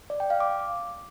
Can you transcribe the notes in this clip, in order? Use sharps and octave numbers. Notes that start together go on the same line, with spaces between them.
D5
G5
F5
D6